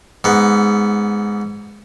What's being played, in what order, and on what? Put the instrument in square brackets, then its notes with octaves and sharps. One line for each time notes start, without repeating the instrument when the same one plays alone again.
[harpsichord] G#2 B3